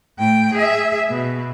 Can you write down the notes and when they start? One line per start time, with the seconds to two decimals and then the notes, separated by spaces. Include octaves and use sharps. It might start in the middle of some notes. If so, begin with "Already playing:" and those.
0.18 A2 G5
0.54 G#4 E5
1.10 B2